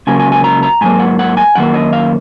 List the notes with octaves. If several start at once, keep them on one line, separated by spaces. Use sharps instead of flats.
C#2 C#3 F#3 A#3 G#5
G#5
G#5
A#5
A#5
G#2 F#3 A#3 G#5
F#5
F#5
G#5
F#2 D#3 A#3 F#5
D#5
F5